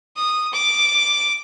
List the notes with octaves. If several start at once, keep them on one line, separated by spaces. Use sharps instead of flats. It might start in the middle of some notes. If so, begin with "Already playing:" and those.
D#6
D6